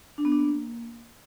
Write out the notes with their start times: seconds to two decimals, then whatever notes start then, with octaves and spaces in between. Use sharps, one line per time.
0.18 D4
0.25 B3
0.32 D4
0.39 A#3